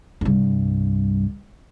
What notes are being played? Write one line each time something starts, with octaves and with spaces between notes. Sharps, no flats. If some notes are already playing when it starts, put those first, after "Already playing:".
C2 G2